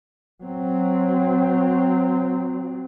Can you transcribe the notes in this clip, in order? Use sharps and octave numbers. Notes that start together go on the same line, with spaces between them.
F#3 C4